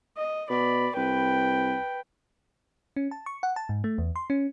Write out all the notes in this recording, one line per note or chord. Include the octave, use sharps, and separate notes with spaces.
D#5
B2 D5 B5
C2 B4 G5
C#4
A5
C#6
F#5
A5
G#2
A3
E2
C6
C#4